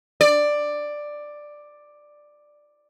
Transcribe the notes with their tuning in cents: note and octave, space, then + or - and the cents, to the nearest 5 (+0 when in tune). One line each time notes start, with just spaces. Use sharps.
D5 +10